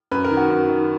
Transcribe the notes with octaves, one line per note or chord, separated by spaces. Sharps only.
F#2 B4
A#4
D#3
F#4
F#2
D#3